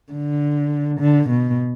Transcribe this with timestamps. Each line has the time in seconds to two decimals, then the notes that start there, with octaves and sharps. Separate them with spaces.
0.12 D3
1.00 D3
1.29 B2